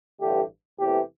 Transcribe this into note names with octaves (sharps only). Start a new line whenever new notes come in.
A1 G2 D3 A3 G4
E2 C3 E3 A3 G4